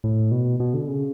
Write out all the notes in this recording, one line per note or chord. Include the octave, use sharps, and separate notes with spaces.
A2
B2
B2
D3
C#3